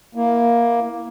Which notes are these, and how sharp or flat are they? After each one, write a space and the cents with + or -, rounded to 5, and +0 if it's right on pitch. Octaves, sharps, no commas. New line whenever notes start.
A#3 +10 E4 +0